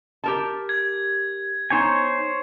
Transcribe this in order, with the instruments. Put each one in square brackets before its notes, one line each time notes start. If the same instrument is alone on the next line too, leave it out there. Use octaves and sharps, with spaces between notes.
[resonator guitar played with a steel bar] G4 A#4 A5
[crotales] G#6
[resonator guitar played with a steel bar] B3 D#4 [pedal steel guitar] C5 C#5 G#5